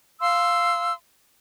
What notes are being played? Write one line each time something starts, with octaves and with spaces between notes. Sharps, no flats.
F5 C6 E6